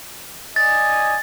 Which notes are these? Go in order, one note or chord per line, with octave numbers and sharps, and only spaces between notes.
D5 D#5 G#5 A6